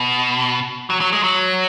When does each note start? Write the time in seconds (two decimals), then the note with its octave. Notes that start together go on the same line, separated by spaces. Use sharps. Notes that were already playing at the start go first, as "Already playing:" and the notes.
Already playing: B2
0.90 F#3
1.01 F#3
1.13 G#3
1.24 F#3